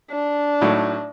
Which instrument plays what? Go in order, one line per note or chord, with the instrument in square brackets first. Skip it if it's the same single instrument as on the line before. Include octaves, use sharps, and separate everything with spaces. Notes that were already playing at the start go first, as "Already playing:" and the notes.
[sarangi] D4
[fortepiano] A2 F#3 D#4